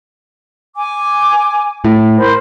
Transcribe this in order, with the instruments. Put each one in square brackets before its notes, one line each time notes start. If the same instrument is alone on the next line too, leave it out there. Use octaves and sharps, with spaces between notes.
[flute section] G#5 D6
[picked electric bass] A2
[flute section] A#4 C5 B5